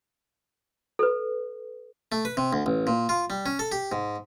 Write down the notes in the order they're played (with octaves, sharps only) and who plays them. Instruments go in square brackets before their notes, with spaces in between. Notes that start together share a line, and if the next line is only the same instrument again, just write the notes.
[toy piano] A4 B4
[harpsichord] A3
B4
C3
D2
A1
A#2
F4
G3
C#4
A4
G4
G#2